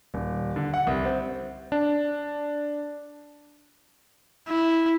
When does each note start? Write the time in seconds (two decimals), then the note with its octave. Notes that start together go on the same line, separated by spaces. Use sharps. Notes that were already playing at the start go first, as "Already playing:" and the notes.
0.14 D#1
0.56 D3
0.74 F#5
0.87 C2
1.05 C4
1.72 D4
4.49 E4